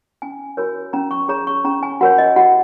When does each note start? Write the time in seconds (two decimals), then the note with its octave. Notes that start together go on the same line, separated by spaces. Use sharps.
0.22 C#4 G#5
0.57 F#4 A#4 C#5
0.93 C#4 A#5
1.11 C#6
1.28 G#4 C#5 A#5
1.47 C#6
1.64 C#4 A#5
1.83 G#5
2.01 F#4 A#4 C#5 F#5
2.18 D#5
2.36 F#4 F#5